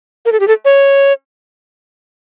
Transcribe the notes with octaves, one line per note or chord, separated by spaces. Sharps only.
A#4
A4
G4
A4
C#5